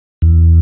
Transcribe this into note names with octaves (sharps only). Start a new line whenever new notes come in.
E2